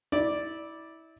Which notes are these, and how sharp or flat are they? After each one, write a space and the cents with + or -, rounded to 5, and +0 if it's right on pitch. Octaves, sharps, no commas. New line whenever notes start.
E4 -25 D5 +0